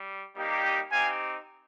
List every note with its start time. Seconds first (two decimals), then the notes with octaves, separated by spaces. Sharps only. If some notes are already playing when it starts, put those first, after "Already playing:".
Already playing: G3
0.36 G3 A#3 D#4 G4
0.64 D#5 G5
0.92 C4 D#4 G4 F5 G#5